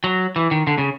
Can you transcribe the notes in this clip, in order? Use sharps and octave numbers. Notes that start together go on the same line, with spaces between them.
F#3
E3
D#3
D3
C#3